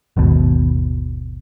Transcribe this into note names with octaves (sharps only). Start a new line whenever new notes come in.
G#1 D#2 B2